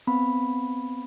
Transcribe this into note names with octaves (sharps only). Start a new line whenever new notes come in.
B3 C4 B5